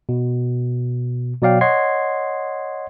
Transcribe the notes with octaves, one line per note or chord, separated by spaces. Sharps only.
B2
B2 F#3 D5 F5 G5
C#5 D#5 F#5 C6 G#6 C7